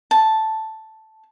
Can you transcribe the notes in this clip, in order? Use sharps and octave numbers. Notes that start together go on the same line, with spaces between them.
A5